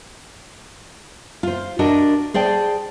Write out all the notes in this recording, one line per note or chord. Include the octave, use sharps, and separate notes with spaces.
F4 C5
D4 F#4 A#4 D#5
G#4 C5 D5 G5 A5